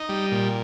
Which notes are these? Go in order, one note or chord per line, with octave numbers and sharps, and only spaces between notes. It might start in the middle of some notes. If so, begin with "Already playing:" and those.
Already playing: D#4
G3
A#2